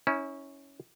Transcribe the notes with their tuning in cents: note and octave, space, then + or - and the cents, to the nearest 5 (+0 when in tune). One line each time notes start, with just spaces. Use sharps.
C#4 +0 E4 -35